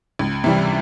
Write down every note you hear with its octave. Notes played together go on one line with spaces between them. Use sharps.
C#2
C3 E3 G3